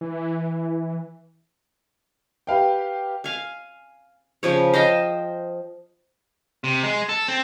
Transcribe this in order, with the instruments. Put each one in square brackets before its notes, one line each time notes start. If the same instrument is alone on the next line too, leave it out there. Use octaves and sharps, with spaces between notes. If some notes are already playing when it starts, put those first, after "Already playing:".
[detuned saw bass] E3
[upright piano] G4 B4 F5 G5
[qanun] F5 G#5
C#3 F3 C#5
C5 D#5 F5 G5
[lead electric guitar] C3
G#3
A4
C4